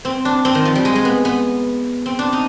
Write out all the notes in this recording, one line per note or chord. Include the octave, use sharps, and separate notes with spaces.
C4
D4
C4
D#3
F3
G3
G#3
G#3
B3
B3
C4
D4
D#4